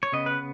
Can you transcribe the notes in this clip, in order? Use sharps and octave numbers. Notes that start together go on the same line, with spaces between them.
C#5
C#3 B3 D#5
B4